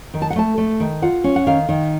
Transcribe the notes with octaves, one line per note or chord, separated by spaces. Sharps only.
D#3
A5
F#5
A3 A5
A3
D#3
F4 F#5
C#4
F#5
D#3 F5
D#3